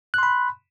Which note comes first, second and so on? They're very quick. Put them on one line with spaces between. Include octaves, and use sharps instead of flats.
F#6 C6 B5